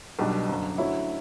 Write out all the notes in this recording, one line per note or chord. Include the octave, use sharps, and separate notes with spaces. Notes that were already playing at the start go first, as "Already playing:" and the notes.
B1 B2 G3 D4
F#1 F#2 D3
D2 D3 F#3 C#4 E4